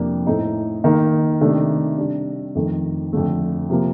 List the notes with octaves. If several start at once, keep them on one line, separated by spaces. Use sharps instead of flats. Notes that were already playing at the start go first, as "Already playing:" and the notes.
Already playing: F2 C3 G3 A#3 D4
A2 A3 C4 D#4
D#3 A#3 D#4
C3 D#3 A3 D4
C3 G3 D4
F2 D#3 A3
F2 D3 A3
C3 F3 A#3